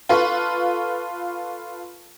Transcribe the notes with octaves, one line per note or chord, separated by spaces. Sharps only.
F4 A4 B4 F5 C#6